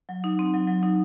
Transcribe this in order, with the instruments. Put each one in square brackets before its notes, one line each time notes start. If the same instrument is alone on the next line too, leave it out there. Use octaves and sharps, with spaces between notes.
[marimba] F#3
D#4
C4
F#3
F#3
D#4